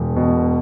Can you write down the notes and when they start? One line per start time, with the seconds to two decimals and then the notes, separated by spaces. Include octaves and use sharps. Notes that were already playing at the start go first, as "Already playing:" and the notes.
Already playing: E1
0.16 B2